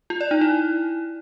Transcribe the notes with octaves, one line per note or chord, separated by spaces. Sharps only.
F4
D5
D#4
E4